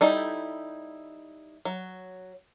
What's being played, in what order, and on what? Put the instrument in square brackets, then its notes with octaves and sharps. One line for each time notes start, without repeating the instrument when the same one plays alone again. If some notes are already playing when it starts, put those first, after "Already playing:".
[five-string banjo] G3 D#4 E4 A4
F#3